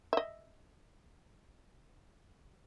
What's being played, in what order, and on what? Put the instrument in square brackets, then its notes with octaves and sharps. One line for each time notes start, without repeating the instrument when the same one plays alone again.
[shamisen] D#5 E5